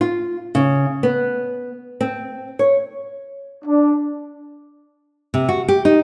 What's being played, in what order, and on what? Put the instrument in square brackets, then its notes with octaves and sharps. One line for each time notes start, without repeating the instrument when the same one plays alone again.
[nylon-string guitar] F4
C#3
B3
C4
C#5
[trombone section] D4
[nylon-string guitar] C3
F#4
G4
D#4